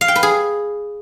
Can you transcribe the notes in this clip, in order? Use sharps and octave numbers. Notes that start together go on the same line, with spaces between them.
F5
G5
B4
G#4